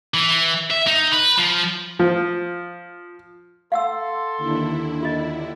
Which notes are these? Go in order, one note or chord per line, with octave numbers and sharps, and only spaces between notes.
E3
E5
D#4
B4
F3
F3
A4 F5 F#5 C6 E6
D#2 D3 E4
F4 D#5